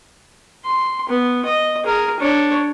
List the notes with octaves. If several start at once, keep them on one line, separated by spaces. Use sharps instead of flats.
C6
B3
D#5
G#4 A#4
D4 C#5